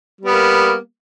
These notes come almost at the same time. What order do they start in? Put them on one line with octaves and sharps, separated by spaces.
G3 B3 A#3